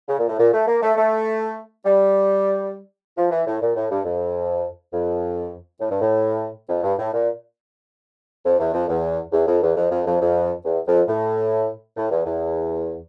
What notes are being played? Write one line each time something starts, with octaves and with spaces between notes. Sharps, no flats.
C#3
A#2
A2
A#2
A3
A#3
A3
A3
G3
F3
E3
A2
A#2
A2
G2
F2
F2
A2
G2
A2
F2
G2
A2
A#2
F2
E2
F2
E2
E2
F2
E2
F2
F2
F2
F2
E2
F2
A2
A2
E2
E2